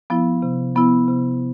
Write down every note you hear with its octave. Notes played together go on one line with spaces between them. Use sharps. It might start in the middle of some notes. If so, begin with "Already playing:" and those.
F3 B3 E4
C3
F3 B3 E4
C3